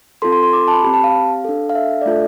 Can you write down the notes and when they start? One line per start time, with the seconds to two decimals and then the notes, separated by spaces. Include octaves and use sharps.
0.22 C4 F4 A4 C6
0.32 C6
0.43 C6
0.53 D6
0.68 A5
0.73 B5
0.83 C4 G4 B5
0.94 A5
1.04 F5
1.44 D4 A4
1.69 F5
1.75 E5
2.01 D5
2.06 A3 D4 F4 A4 E5